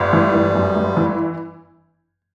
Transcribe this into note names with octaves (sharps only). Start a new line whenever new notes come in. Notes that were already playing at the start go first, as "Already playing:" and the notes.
Already playing: G1 G3
E3
G1
F#2
G1
E3